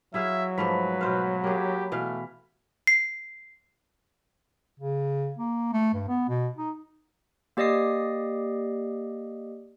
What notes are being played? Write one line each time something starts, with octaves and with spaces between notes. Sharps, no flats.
F#3 E4 G#4 E5 F5
G#2 F3 A3 B4 B5 B6
B2 C5 F5
A#3 G4 G#4
B2 E3 A3 F5
C7
C#3
A#3
A3
G2
B3
B2
D#4
A#3 G4 D5 D#5 D#6 C7